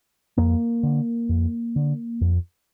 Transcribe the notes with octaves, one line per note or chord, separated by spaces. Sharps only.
F2 A#3
D3
F2
D3
F2